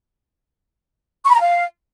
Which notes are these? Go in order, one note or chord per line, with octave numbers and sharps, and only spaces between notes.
C#6
B5
A#5
F5